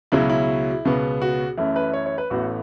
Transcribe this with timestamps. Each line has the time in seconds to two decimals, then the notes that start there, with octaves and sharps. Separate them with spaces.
0.12 C#2 B2 F#3 C#4 E4
0.30 E4
0.85 C#2 B2 B3
1.22 F#4
1.57 F#2 E3 A3
1.76 B4
1.93 C#5
2.06 C#5
2.18 B4
2.30 A1 A2 E3 B3 F#4